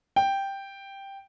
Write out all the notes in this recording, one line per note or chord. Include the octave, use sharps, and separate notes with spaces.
G5